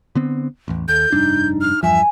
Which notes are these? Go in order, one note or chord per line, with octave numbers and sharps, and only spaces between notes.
D3 B3 C4
A1 E2
D#2 A4 G6
F1 G2 D4 D#4
F6
E2 G2 F3 E5 G#5